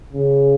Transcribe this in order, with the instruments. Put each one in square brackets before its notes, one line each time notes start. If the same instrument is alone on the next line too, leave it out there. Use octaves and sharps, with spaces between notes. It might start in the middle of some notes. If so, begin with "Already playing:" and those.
[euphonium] C#3